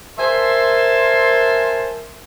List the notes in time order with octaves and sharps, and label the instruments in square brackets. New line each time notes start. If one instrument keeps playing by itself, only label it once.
[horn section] A#4 C5 E5 G#5 A5 C6